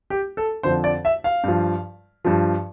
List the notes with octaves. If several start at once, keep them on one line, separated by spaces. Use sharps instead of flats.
G4
A4
F2 D3 F3 C5
D5
E5
F5
G2 F3
G2 F3